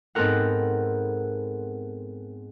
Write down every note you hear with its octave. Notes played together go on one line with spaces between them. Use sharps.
G#2 B3 C4 A4 A#4 F#5